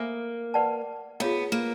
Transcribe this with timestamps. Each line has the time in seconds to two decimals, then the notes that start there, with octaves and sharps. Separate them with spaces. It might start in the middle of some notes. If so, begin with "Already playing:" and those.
Already playing: A#3 A4 C5 E5 G#5 B5
0.54 B4 D5 F#5 A5
1.20 B3 F4 G#4 C#5 F5 A#5
1.52 A#3